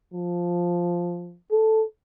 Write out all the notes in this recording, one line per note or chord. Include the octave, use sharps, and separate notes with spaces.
F3
A4